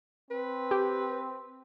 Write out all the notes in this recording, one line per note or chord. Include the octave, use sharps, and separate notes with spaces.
C4 B4
G4